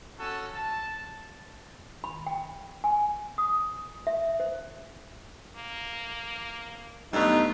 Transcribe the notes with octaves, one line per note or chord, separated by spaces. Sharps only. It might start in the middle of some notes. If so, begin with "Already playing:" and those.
C#4 F#4 A4
A5
B5
G5
G#5
D#6
E5
C5
A#3
G2 F#3 A3 B3 D#4 F4